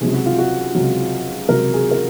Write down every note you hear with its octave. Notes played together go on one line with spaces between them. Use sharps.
C#2 C3 F#3 G#4
F#4
F4
F#4
C#2 C3 F#3
C#2 C3 F#3 A#4
G#4
A#4